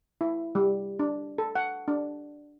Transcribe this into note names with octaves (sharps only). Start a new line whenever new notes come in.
E4
G3
D4
A4
F#5
D4